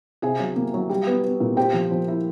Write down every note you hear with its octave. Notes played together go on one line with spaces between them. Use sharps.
C3 G#4 G#5
F#3
A#3
F#3
G3
B3
B3
A#2
C4 G4 G5
F3
F3
E4